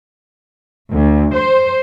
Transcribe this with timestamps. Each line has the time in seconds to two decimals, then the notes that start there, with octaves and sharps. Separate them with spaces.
0.94 D2
1.34 C5